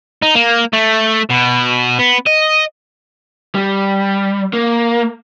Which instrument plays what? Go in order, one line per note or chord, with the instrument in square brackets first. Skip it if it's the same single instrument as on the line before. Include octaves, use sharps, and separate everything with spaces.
[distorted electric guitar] D#4
A#3
A3
B2
B3
D#5
[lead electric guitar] G3
A#3